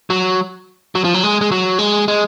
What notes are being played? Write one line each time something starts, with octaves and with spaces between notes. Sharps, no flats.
F#3
F#3
F3
F#3
G#3
G#3
F#3
G#3
G#3